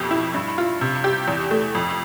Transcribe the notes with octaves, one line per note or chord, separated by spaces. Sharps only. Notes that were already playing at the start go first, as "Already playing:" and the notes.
Already playing: F2 B2 G4
E4
G2
F4
C3
G4
E2
A3
F2